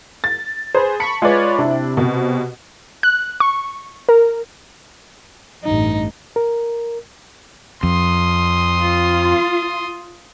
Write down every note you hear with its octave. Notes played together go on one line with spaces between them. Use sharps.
A6
G#4 B4 C5
A5 B5 C#6 C#7
G#3 F4 B4 C#5 D5
C3 D4 E4
B2
F#6
C#6
A#4
A1 G2 D#4
A#4
F2 C6 D#6
F4